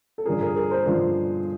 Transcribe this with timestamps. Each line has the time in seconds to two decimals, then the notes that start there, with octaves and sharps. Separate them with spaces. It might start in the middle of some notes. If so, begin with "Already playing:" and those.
0.18 A4
0.26 G2 D3 F3 G#3 G#4 A#4
0.41 G#4 A#4
0.56 G#4 A#4
0.71 A#4 C5
0.86 G2 D3 F3 G#3